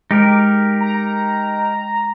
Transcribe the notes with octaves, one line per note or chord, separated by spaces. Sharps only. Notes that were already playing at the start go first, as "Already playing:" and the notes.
G#3 D#4 G4 A#4
A#5